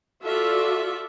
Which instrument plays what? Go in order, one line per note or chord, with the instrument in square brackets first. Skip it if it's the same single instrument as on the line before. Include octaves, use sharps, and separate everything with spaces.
[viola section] F4 F#4 A4 D5 E5